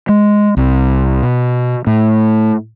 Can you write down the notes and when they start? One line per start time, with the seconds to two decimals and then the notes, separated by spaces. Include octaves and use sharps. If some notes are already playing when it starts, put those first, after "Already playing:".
0.09 G#3
0.57 C2
1.22 B2
1.87 A2